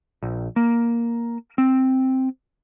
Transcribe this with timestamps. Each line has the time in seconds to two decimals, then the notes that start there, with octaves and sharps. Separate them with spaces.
0.23 A#1
0.56 A#3
1.58 C4